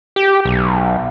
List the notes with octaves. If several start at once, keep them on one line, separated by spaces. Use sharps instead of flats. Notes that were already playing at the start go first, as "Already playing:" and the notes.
G4
B1